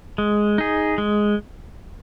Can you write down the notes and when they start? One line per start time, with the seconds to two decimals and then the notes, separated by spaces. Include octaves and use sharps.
0.18 G#3
0.58 D#4 G#4
0.98 G#3